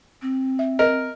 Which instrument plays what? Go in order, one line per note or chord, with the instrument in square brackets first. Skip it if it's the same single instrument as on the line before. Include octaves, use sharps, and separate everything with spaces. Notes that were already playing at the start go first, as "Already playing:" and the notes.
[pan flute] C4
[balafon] E5
[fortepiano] A#4 [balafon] D#5